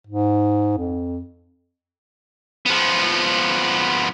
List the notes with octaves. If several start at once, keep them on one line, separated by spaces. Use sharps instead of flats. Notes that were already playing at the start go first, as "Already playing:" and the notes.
G#2
F2
F3 B3